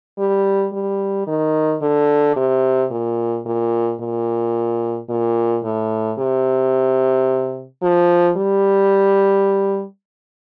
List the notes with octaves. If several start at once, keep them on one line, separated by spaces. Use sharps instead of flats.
G3
G3
D#3
D3
C3
A#2
A#2
A#2
A#2
A2
C3
F3
G3